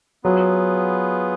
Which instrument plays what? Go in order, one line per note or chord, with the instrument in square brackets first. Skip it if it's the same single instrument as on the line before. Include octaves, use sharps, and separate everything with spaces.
[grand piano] F#3 [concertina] B3 F4 G#4 B4